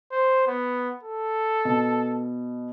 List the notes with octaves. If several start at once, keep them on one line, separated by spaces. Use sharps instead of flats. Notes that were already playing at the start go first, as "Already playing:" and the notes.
C5
B3
A4
B2